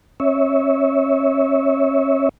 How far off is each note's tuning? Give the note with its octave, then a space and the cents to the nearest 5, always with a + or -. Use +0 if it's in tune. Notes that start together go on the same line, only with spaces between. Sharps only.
C#4 -40 C#5 +5 E5 -25